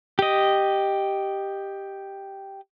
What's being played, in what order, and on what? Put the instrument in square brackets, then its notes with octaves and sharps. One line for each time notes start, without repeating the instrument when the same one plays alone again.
[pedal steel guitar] G4 D#5